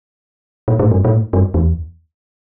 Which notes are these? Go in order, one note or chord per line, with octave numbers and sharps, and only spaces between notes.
A#2
A2
G2
A#2
A2
G2
E2